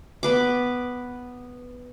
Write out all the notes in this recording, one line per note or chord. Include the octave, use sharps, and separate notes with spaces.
B3 B4 D6